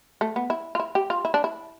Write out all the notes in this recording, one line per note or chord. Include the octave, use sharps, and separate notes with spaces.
A3
B3
E4
F4
E4
G4
F4
E4
D4
E4